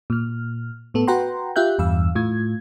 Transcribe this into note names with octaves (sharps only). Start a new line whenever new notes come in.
A#2 F6
A2 B3 A4
F#4 B4 F#5 G5 A#5 C6
F4 G4 E5 F#6 G6
E2 G2 F5 E6
A2 F4 G#6